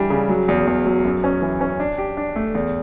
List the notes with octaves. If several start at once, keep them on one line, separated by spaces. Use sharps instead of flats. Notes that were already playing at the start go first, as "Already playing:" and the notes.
Already playing: E3 G3 D4
C#3
F#3
E2
E2
F#3
F#2
C#4
E3
C#4
D4
G4
D4
A3
E2